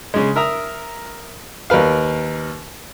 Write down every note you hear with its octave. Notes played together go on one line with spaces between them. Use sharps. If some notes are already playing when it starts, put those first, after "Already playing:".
C#3 G#3
A#4 E5 A#5 D#6
D#2 A#4 B4 F5